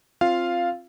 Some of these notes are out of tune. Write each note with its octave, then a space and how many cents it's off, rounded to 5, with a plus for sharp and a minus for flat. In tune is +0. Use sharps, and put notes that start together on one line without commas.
C4 +20 F4 +0 F5 -5